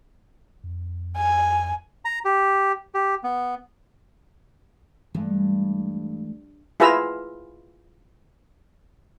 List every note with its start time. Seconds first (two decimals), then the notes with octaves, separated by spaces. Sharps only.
0.64 F2
1.16 G#5
2.05 A#5
2.25 G4
2.94 G4
3.23 B3
5.15 G2 E3 G#3 A3
6.80 E4 F4 G#4 B4 A#5 E6